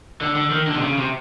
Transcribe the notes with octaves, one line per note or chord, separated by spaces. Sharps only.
D3
D3
D#3
D3
C3
C#3
C3